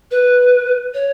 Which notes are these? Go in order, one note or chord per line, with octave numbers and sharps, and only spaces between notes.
B4
C#5